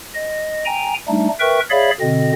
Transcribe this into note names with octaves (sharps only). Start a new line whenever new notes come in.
D#5
G5 G#5 A#5
G3 A3 D4 D#4
A#4 B4 E5 G5 C#6
G#4 C#5 D5 E5 F5 B5
B2 D3 C4 D#5